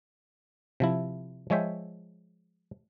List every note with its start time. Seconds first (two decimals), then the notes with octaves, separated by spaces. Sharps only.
0.80 C3 F3 E4
1.50 F3 G#3 C#5 E5 G5